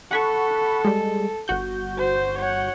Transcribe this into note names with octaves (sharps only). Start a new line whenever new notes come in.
A4 F#5 B5 C#6
G3 G#3
G1 F#4 G6
C5
C#5 F#5